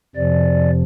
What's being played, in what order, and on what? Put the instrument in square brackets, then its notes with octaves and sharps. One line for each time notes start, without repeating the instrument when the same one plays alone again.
[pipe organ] F2 C3 F3 D5